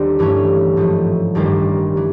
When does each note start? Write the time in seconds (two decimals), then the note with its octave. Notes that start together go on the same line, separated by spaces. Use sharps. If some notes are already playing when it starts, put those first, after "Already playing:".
Already playing: D#2 D3 G3 C4 D#4
0.19 G2 E3 A3 C#4
0.77 G#2 F3 A3
1.35 A1 G2 D#3 G3 A#3
1.97 E3